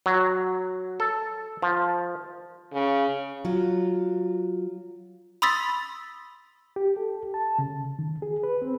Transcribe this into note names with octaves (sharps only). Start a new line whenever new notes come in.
F#3
A4
F3
C#3
F#3 F4
B5 C6 D#6 E6 A6 B6
G4
A4
A5
C#3
D#3
G#4
B4
C4